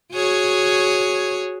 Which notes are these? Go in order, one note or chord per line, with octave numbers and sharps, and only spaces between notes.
F#4 G#4 C#5